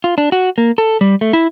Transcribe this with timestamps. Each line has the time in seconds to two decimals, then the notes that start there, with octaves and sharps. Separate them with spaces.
0.04 F4
0.18 D4
0.32 F#4
0.58 A#3
0.78 A4
1.01 G3
1.21 A3
1.33 E4